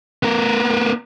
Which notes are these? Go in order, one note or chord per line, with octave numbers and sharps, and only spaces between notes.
B3 A#4